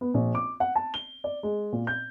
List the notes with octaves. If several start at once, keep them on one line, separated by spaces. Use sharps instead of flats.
B3
A#1
D6
F#5
A5
G7
D5
G#3
A#2
G6